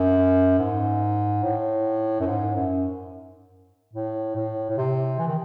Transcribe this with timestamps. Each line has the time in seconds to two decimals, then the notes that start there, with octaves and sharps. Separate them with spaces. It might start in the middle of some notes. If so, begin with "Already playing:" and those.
Already playing: F#2
0.59 G#2
1.43 A2
2.20 F#2
2.27 G#2
2.55 F#2
3.93 A2
4.36 A2
4.69 A2
4.77 C3
5.19 E3
5.27 D#3